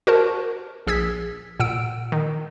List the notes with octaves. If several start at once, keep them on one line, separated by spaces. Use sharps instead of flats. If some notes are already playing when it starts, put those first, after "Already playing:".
F#4 A#4 C5 A5
A#1 G#4 E6 G#6 B6
A#2 F#5 E6 D7
D#3